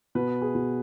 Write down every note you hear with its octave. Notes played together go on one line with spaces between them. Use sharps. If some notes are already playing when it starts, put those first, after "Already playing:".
B2 B4
G#4
B2